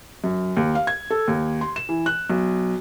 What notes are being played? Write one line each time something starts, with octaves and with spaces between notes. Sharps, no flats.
F#2
D#2
F5
G#6
A4
D#2
C6
E7
E3
F#6
B1